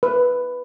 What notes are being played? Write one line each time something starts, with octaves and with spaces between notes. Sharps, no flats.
B4